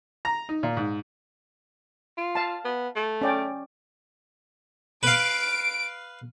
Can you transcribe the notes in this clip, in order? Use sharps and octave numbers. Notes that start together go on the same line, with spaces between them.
A#5
D#4
A#2
G#2
F4
F5 A5
B3
A3
C#4 D5 G5
B4 F5 D7